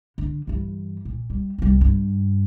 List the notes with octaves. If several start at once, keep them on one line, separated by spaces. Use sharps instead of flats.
D3
G2 E3
A#2
G3
C2 G3
G2